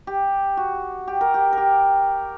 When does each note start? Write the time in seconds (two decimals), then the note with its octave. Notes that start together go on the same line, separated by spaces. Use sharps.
0.07 G4
0.57 F#4
1.07 G4
1.21 A#4
1.34 G4
1.52 G4 A#4